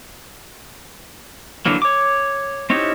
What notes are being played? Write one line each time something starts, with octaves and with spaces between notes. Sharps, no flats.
D3 E3 F#3 A#3
C#5 D6
C4 C#4 D#4 E4 G4